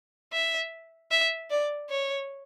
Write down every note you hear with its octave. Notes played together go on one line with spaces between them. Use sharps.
E5
E5
D5
C#5